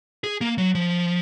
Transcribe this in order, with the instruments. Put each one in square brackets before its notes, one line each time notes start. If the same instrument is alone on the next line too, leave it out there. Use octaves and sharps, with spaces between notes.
[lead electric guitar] G#4
A#3
F#3
F3